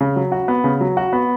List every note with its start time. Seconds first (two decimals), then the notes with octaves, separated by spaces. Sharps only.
0.01 C#3
0.16 F#3
0.32 F#4
0.48 B3
0.64 C#3
0.81 F#3
0.97 F#4
1.13 B3